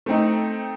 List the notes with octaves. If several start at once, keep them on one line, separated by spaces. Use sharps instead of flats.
A3 C4 D#4